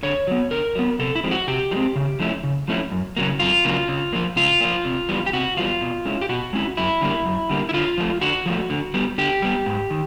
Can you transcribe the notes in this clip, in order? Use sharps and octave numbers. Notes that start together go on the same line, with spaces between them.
D3 C#5
F#3 B3
D3 A#4
F#3 B3
C3 A4
E4
F3 G#3 C4
F#4
C3 G4
F3 G#3 C4
C#3
F3 A3 C#4 E4
C#3
F3 A3 C#4 E4
F#2
C#3 F#3 A#3
F#2 F4
C#3 F#3 A#3
C#3
F3 A#3
C#3 F4
F3 A#3
C3
E3 G3 B3
G4
C3 F#4
E3 G3 B3 F4
B2
G#3 C#4 E4
G4
B2 F#4
G#3 C#4 E4
F#2 E4
D3 G3 A#3
F#2
D3 G3 A#3
E4
D3 F4
F3 A3
D3 F#4
F3 A3
D3
G3 B3
D3 G4
G3 B3
G#2
D#3